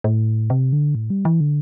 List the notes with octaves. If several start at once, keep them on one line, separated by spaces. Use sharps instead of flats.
A2
C3
D3
A2
G3
E3
D3